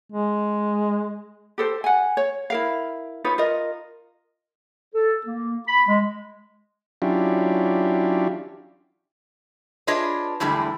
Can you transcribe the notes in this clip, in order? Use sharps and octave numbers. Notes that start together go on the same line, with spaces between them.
G#3
G4 A4 C5
F#5 G#5
C#5
E4 A#4 F5
D#4 F4 B4 C#5
F4 A#4 D#5
A4
A#3
B5
G#3
F#3 C#4 D4 E4 F4 G4
D4 F4 G#4 B4 C#5 D#5
E2 A2 D3 G3 G#3